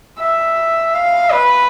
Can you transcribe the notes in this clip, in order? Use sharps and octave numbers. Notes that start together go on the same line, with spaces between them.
E5
F5
B4